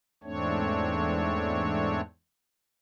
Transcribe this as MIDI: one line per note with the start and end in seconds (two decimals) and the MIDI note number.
0.24 2.01 40
0.24 2.01 44
0.24 2.01 57
0.24 2.01 60
0.24 2.01 62
0.24 2.01 73